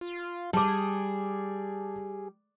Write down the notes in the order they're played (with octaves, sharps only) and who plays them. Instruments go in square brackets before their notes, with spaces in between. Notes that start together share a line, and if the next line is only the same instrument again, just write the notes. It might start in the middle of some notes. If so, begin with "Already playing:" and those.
[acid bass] F4
[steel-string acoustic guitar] G3 [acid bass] G#4 [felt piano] A5 D6